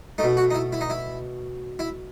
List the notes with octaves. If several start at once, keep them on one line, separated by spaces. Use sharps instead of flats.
B2 A3 D#4
F#4
D#4
E4
E4
D#4
E4
E4